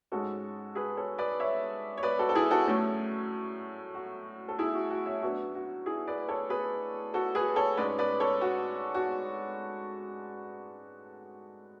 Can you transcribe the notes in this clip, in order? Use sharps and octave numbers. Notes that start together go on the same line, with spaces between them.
G#2 G#3 C#4 F#4 A4
G#4 B4
A4 C#5
B4 D5
C#5 E5
C#5
B4 D5
F#4 A4
A4
E4 G#4
F#4 A4
A2 F#3 A3 C#4
F#4
A4
E4 G#4
F#4
F#4
C#5 E5
A2 F#3 B3 D4 F#4
F#4
E4 G#4
B4 D5
A4 C#5
G#4 B4
F#4 A4
G#4 B4
A4 C#5
G#2 G#3 C#4 B4 D5
B4 D5
A4 C#5
F#4
F#4